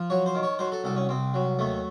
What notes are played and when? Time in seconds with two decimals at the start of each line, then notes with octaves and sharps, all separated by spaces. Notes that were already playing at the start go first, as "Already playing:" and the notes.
Already playing: F3
0.10 F#3 C#5
0.26 C5
0.35 D#3
0.43 C#5
0.59 F#3 C5
0.72 A4
0.84 C2 A4
0.96 C#4
1.09 C2 C4
1.34 F#3
1.59 D#2 A3